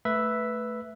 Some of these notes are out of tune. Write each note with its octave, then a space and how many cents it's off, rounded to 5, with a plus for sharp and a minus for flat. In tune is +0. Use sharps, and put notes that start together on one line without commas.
A3 +0 B4 +0 E5 +0